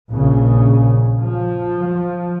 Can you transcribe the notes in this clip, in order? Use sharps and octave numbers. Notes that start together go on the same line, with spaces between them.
A#1 C#3
F3